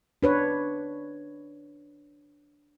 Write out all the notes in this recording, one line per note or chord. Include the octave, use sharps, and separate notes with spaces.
D4 B4 C#5